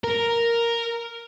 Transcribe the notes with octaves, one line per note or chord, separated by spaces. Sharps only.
A#4